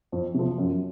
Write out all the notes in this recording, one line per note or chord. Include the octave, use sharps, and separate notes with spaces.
F2
C3 F3
F#2